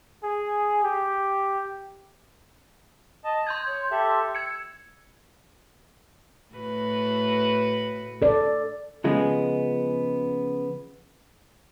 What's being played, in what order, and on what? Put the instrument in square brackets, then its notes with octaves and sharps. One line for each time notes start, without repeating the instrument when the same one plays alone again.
[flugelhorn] G#4
G4
[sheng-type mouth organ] D#5 A5
[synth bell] C6 G6 G#6 [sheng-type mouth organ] D#6
[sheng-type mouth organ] C#5
G4 A4 E5
[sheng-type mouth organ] E6 [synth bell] G#6 C#7
[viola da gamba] A2 F#4 B4
[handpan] A4 D5
[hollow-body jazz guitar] C#3 F3 G#3 B3